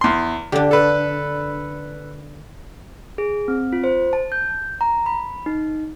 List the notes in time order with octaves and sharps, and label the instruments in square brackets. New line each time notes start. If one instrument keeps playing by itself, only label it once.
[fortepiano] E2 C6
[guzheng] D3 D4 [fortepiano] G4
[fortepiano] A4 B4
[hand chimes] G#4
C4
F4
C5
A5
G6
A#5
B5
D#4